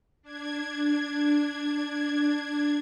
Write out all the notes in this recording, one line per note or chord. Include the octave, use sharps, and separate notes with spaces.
D4 G#6